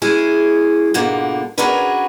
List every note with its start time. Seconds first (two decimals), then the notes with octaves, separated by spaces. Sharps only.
0.02 G#3 C#4 E4 G#4
0.94 G#2 B2 D3 A#3 F4
1.58 C#4 D4 F#4 G#4 A#4 B4